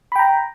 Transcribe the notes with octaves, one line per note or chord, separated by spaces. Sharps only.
G5 A#5 B5